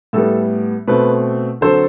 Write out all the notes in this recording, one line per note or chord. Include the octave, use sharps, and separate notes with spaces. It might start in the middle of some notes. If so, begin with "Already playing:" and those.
A2 G3 B3 A4
B2 A3 C4 B4
D3 F#3 C4 A4 C5